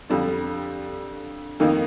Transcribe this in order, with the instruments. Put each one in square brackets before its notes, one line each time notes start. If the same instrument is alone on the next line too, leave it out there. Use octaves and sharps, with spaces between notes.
[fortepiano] F2 D3 G3 D4
F2 D#3 A#3 D#4